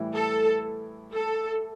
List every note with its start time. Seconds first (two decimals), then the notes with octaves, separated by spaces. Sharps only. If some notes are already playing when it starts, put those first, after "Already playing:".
Already playing: A2 E3 G3 E4
0.14 A4
1.13 A4